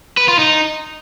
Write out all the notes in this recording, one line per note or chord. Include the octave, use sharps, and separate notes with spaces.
B4
F4
D#4